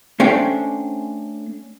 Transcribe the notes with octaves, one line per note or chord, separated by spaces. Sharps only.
A3 C#4 D4 C5 G5